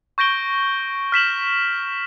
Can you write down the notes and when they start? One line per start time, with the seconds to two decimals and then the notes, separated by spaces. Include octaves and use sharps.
0.18 C#6 G6 A#6 D7 G7
1.12 F6 B6 E7 F#7